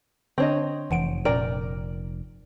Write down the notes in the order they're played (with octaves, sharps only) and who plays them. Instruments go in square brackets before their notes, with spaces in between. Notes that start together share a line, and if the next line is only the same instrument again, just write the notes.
[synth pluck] D3 D4 [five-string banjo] C4 C#5 D#5
[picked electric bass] F1 [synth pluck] E3 F#5 D7
[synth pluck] A#2 C#4 D7 [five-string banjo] A#4 D5 G5